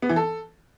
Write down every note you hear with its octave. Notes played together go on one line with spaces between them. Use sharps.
B3
E3
A4